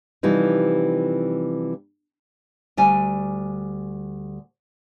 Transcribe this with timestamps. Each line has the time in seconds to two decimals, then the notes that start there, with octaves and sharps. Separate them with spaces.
0.23 C3 E3 F3 G3 D#4
2.77 D2 G3 G#5